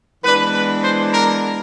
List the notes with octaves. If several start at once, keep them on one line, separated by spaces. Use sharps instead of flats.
E3 G#3 B3 D4 B4
B4
C5
A#4